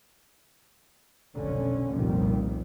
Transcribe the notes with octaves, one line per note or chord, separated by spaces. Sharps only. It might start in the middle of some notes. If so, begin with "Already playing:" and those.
F1 B1 D3 C#4
F1 C2 F2 A#2 D#3 G3